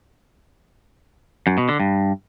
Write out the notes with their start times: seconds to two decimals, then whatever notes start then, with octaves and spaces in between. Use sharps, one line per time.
1.47 F#2
1.58 B2
1.69 D3
1.80 G2